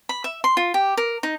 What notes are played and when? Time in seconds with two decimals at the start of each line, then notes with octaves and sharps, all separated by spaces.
0.09 B5
0.24 E5
0.44 C6
0.57 F4
0.74 G4
0.97 A#4
1.23 D#4